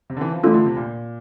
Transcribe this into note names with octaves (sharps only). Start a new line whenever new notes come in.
C3
D3
E3
F3
E3 A3 D4 F4 A4
D3
C3
A#2